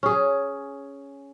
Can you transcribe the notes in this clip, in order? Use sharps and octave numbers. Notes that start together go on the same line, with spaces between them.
C#4 G#4